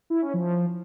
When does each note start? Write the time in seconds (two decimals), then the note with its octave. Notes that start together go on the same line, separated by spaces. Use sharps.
0.10 E4
0.22 C#4
0.34 F3